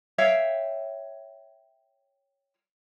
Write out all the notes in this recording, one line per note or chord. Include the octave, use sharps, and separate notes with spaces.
C#5 E5 F5 G5